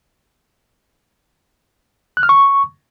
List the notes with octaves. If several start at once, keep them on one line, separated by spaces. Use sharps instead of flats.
F#6
F6
C#6